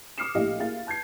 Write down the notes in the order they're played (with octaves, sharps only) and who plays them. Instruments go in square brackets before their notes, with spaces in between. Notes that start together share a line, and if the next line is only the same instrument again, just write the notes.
[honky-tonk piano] D6 D#6 F6 C7 C#7 E7
A#1 A2 E4 G4 D#5 F5
A#3 E4 G#4 F5 A6
A5 G6 G#6 C7